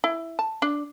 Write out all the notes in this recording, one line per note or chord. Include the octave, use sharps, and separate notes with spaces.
E4
A5
D4